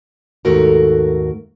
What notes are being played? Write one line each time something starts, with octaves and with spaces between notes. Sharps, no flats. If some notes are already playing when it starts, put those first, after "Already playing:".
D#2 G#2 A3 F#4 A#4 A#5